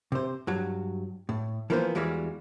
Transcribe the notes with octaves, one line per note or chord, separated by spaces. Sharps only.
C3 C5
G2 F#3
A2
E3 F3 A#3 B3 B4 C5
E2 E3 G3 G#3 F#4 F5